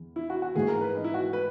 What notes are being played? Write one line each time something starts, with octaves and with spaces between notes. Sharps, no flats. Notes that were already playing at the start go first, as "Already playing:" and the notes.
Already playing: E2
E4
F#4
F#4
G#2 E3 A#3 G#4
A#4
B4
D#4
E4
F#4
B4